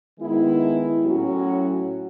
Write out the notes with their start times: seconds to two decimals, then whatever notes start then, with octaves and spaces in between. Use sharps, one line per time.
0.18 D#3 G#3 B3 E4
1.04 A2 F#3 C#4 F#4